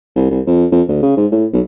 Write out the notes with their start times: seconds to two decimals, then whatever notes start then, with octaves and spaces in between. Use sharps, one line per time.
0.16 C2
0.31 C2
0.46 F2
0.72 F2
0.88 D2
1.02 C#3
1.17 G#2
1.32 A2
1.53 B1